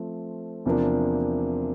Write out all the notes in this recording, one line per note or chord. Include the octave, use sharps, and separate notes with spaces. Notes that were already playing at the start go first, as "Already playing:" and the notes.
Already playing: F3 A3 C4
E2 C3 F3 A#3 D4